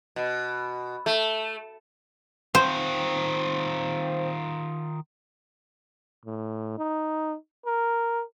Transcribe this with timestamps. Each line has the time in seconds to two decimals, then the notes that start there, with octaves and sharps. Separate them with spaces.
0.16 B2
1.06 A3
2.55 D#3 C4 F4 C5
6.25 A2
6.78 D#4
7.66 A#4